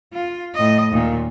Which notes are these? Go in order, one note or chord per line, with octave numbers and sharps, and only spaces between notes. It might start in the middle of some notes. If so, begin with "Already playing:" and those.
F4
A2 D#5
D#2 A#2